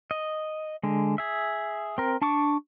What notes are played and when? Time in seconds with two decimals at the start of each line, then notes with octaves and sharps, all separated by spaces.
0.11 D#5
0.83 D3 G#3
1.18 G#4 E5
1.98 C4 A#4
2.22 D4 A5 C#6 D6